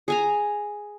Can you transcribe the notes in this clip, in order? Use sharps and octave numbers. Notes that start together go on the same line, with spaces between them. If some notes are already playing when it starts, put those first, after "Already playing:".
G#4 G#5 A#5